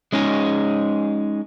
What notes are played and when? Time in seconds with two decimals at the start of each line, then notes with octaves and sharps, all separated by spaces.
0.12 G#3 C#4 D#4 G#4